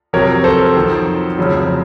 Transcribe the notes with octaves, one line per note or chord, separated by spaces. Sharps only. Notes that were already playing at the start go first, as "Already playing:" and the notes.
F2 C3 F#3 A#4 C#5
A4 C5
F2 D#3 F#3
F1 F2 C#3 F#3